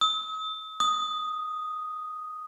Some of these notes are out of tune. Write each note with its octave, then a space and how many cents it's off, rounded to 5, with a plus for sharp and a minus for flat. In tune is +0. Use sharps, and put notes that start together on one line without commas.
D#6 +45
D#6 +0